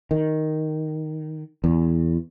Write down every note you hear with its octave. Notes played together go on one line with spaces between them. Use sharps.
D#3
E2